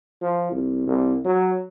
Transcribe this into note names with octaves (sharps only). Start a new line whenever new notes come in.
F3
C2
C2
F#3